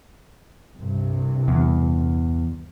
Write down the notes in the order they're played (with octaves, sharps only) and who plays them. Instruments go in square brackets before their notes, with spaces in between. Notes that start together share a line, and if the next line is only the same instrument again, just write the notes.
[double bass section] C2 G2 C3
[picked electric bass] E2